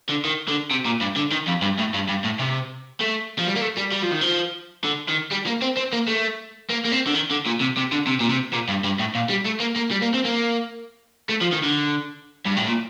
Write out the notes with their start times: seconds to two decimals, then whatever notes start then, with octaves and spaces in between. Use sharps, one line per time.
0.09 D3
0.25 D#3
0.48 D3
0.71 C3
0.85 A#2
1.01 G2
1.17 D3
1.32 D#3
1.47 F2
1.62 G2
1.79 A2
1.94 G2
2.09 G2
2.24 A2
2.40 C3
3.01 A3
3.39 F3
3.47 G3
3.56 A#3
3.62 A3
3.78 G3
3.92 G3
4.03 F3
4.12 D#3
4.22 F3
4.84 D3
5.08 D#3
5.31 G3
5.46 A#3
5.62 C4
5.77 C4
5.93 A#3
6.08 A3
6.70 A#3
6.85 A#3
6.92 C4
7.07 D3
7.14 D#3
7.31 D3
7.46 A#2
7.60 C3
7.77 C3
7.92 D3
8.07 C3
8.20 A#2
8.30 C3
8.53 A#2
8.69 G2
8.84 G2
8.99 A2
9.15 A#2
9.29 G3
9.45 A3
9.60 A#3
9.76 A#3
9.91 G3
10.02 A#3
10.14 C4
10.25 A#3
11.29 A3
11.41 F3
11.52 D#3
11.64 D3
12.46 G2
12.57 A2
12.67 A#2